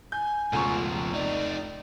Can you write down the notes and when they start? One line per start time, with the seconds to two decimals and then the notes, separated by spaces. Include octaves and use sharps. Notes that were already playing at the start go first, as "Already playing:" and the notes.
0.12 G#5 G6
0.53 F1 C#2 B2 F3 C#6
1.14 C3 D#4 D5